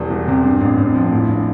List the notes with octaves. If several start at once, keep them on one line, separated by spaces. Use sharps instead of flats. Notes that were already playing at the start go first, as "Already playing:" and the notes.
Already playing: E1 E2 G3
E1
C3
G2
A1
A1
F3
A2
A#1